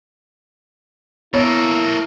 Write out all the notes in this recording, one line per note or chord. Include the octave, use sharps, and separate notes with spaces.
A#3 B3 E4 A4 C#5